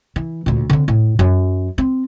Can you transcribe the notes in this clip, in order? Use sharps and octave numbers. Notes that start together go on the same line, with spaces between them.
E3
D2 A#2
D3 C4
A2
F#2 F#3
C4